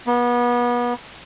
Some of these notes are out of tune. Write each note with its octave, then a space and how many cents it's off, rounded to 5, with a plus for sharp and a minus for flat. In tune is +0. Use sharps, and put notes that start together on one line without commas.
B3 -30